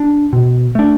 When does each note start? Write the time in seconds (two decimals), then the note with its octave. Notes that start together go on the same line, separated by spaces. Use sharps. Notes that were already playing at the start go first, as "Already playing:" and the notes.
Already playing: D4
0.33 B2
0.75 A3 D4